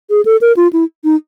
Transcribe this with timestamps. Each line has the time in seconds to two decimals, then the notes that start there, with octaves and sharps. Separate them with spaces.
0.10 G#4
0.25 A4
0.41 A#4
0.57 F4
0.73 E4
1.04 D#4